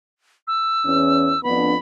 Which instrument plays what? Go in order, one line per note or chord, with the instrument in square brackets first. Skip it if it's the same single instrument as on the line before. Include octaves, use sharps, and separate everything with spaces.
[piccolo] E6
[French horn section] E2 C#4
[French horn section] F2 B3 D4 [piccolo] B5